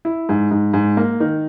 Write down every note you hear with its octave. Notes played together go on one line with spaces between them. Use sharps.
E4
G#2
G#2
G#2
A#3
D#3